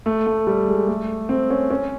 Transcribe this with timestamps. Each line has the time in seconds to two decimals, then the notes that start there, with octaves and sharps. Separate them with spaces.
0.06 A3
0.26 A3
0.47 G3
0.68 G#3
0.88 A3
1.29 C4
1.51 C#4
1.70 C#4